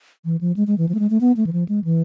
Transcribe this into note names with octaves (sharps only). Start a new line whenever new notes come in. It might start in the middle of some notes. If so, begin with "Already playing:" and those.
E3
F3
G#3
G#3
E3
F3
A3
G#3
A3
B3
A3
E3
F3
G#3
E3